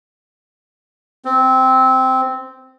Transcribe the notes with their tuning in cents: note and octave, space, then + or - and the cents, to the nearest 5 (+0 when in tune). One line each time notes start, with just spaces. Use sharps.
C4 -5